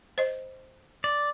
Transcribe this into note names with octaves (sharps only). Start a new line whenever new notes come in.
C5 D#5
D5